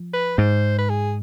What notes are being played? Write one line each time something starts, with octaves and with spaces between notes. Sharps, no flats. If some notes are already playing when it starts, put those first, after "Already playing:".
Already playing: F3
B4
G#2 C5
B4
G#4